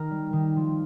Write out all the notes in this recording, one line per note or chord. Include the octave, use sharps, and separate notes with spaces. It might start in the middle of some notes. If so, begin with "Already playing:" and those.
Already playing: D#3 A#4
G3
D#3
F3